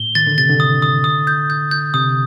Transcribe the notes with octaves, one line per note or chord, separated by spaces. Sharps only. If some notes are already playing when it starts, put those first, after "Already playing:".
Already playing: A2 G7
D#3 A6
D3
C3 A6
D3
D#6
D#6
D#6
G6
G6
G6
C3 D#6